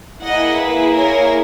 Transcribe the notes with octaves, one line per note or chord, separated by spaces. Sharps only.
A#3 E4 G#4 D#5 F#5
B4
A#4 C#5